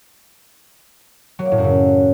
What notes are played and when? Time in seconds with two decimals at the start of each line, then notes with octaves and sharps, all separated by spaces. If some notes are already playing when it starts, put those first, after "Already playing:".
1.39 F#3
1.45 A#3
1.52 A2
1.58 F#2
1.64 C#3